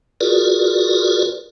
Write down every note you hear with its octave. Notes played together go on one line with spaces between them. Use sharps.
F4 F#4 G#4 A#4 B4 D5